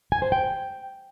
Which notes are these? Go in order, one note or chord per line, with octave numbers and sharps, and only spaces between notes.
G#5
C5
G5